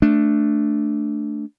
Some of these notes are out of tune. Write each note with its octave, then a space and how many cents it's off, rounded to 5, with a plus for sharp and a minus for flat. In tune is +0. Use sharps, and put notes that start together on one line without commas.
A3 +0 D4 +0